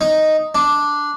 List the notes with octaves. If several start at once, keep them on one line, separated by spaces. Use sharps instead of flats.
D#4
D4